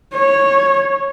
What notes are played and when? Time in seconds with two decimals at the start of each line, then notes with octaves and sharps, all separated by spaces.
0.14 C#5